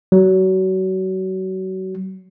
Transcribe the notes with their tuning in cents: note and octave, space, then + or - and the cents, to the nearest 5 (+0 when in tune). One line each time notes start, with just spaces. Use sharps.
F#3 +30